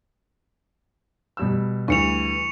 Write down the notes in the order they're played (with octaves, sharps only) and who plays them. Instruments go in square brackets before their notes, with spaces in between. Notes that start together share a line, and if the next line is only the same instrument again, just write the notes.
[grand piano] B2 G3 E6
[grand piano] D2 E3 G3 [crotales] C#6 C#7 F7